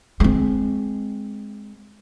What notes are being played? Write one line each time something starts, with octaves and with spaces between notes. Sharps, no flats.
G#3 C4